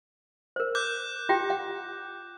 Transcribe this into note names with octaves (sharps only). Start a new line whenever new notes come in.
A#4 C5
D6 F#6 G6
F4 G4 G5
F#5